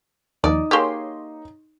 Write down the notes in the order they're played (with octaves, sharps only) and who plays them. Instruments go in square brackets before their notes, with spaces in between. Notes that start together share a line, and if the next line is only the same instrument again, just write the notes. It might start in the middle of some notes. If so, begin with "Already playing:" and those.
[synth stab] D#2 F3 [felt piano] D#4 D#6 [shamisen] D5
[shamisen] A#3 G4 [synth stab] G#4 C#5 C6